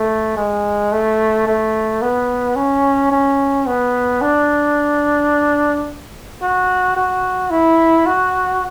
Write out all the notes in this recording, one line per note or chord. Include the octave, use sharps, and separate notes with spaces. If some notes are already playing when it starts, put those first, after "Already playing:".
Already playing: A3
G#3
A3
A3
B3
C#4
C#4
B3
D4
F#4
F#4
E4
F#4